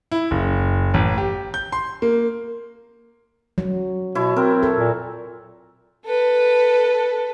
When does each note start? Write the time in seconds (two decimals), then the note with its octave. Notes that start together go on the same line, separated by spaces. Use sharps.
0.12 E4
0.31 F#1
0.94 A1
1.18 G4
1.54 G6
1.72 C6
2.02 A#3
3.58 F#3
4.15 B2 E4 C#5
4.36 C4 A#4
4.63 A4
4.77 A#2
6.05 A4 B4